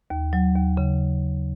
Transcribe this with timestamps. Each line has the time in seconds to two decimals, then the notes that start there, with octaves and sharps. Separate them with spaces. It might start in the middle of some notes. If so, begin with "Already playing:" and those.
0.10 D#2
0.33 F#3
0.56 D#2
0.77 C#3